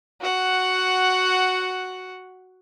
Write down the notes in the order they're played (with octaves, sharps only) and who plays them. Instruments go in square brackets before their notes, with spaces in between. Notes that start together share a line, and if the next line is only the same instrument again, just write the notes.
[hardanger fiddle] F#4 F#5